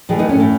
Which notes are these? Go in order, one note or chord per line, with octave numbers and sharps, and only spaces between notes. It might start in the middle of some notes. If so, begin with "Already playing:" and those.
A2 E3 G#3
B3 D#4
A3 C#4
A2